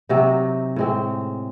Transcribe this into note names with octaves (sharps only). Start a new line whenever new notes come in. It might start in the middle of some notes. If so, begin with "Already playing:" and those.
C3 F#3 C4 D#4
A2 G#3 C4